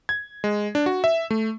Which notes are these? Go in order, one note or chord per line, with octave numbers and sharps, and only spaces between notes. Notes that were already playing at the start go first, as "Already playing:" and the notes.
G#6
G#3
D4
F#4
E5
A3